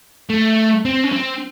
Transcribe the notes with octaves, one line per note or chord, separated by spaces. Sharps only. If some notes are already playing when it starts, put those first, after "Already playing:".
A3
C4
C#4
C4